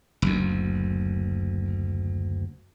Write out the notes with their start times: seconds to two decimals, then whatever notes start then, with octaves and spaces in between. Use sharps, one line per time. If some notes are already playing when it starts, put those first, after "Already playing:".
0.22 F#1 D2